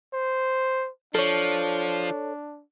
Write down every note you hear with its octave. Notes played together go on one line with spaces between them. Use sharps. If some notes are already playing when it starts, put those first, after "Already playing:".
C5
F3 D4 A4 C#5